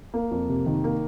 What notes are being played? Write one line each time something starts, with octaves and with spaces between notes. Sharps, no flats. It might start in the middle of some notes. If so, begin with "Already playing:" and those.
A#3
F2
C3
D#3
A#3